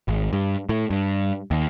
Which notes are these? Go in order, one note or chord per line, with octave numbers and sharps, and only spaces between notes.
G#1
G2
A2
G2
D#2